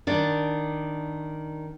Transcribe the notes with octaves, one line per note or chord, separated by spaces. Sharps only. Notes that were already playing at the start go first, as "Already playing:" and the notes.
D#3 D4